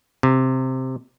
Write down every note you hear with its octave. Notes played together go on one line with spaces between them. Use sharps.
C3